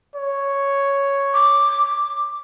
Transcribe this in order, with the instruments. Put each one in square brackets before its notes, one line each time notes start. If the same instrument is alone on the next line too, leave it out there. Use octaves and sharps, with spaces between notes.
[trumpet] C#5
[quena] D6